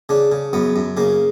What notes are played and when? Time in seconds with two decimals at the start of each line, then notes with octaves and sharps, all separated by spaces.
0.09 C#3 D4
0.32 C#3
0.53 F#2 B3
0.76 F#2
0.97 C#3 A#3